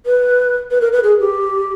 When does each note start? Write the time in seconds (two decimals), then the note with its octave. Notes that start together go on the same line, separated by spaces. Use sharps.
0.06 B4
0.71 B4
0.81 A#4
0.92 B4
1.03 G#4
1.20 G4